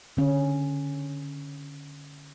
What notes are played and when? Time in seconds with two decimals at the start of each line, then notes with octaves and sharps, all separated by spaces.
0.17 D3 C#4